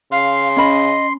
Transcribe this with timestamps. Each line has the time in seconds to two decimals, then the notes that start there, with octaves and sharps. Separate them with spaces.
0.12 C#3 F5 C6
0.57 C#4 D#5 B5